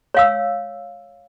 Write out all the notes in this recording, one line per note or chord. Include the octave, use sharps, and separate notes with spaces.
C#5 F5 E6